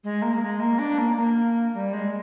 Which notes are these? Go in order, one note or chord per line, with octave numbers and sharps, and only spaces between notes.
G#3
A#3
A#3
G#3
A#3
D4
A#3
A#3
G3
G#3